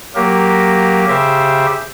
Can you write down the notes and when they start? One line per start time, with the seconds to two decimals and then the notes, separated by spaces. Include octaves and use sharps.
0.15 F#3 A#3 G4 A#4
1.08 C#3 G4 C5 E5